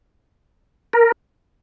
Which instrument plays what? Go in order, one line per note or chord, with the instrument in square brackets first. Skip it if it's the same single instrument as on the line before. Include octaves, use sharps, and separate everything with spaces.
[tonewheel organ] A#4